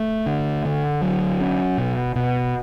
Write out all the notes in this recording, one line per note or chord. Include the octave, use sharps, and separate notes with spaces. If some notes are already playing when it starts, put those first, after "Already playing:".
Already playing: A3
D3
D3
F#3
C#4
B2
B2